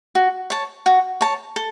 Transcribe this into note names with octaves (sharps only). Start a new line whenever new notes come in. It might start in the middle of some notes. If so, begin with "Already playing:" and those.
F#4
C#5 A5
F#4
C#5 A5
A4